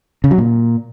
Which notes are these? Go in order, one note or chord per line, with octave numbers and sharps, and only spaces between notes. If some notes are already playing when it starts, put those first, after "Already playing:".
C#3
F#3
A#2